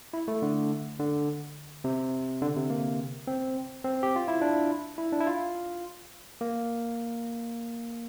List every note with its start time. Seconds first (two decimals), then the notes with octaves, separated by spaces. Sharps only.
0.13 E4
0.28 A3
0.42 D3
1.00 D3
1.84 C3
2.42 D3
2.56 C3
2.70 A#3
3.27 C4
3.84 C4
4.03 G4
4.16 F4
4.28 E4
4.42 D4
4.98 E4
5.13 D4
5.20 E4
5.27 F4
6.41 A#3